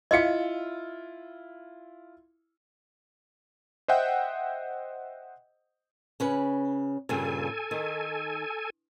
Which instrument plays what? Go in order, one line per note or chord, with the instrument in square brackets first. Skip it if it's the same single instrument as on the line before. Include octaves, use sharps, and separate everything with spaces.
[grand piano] E4 F4 C#7 [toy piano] D#5 F5
[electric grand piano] C5 D#5 E5 F#5 G5
[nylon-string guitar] C#3 C#4 B4
[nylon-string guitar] G2 A#2 C#3 [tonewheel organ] A4 G#5
[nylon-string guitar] D#3